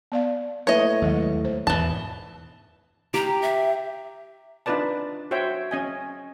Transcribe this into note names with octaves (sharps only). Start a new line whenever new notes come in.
B3 D5 F5
A2 A#3 B4 C#5 D#5 E5
D#2 F#3 G#3 A3
C5
E2 G#2 B2 E3 A5
G4 A#5
E5
D4 D#4 F4 B4 D5 A5
F#4 C5 C#5 E5 G5
C#4 D#5 G#5